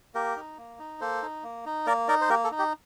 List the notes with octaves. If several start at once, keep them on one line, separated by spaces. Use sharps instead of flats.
A#3 G4 A#4
D#4
A#3
D#4
A#3 A4 C5
D#4
A#3
D#4
A#3 A#4 D5
D#4 A#4 D5
C5
A#3 G4 A#4
A4
D#4
G4